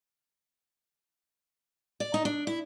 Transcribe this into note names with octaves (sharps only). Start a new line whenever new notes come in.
D5
D#4
D4
E4